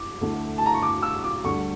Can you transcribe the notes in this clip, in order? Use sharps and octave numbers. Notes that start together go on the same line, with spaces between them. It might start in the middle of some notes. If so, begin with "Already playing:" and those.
Already playing: D6
D2 D3 A3 E4
A5
A#5
C#6
D6
E6
D6
D2 D3 G3 D4 C#6